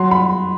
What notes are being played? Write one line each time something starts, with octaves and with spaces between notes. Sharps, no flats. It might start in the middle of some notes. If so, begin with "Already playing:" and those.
Already playing: F#3 C6
B5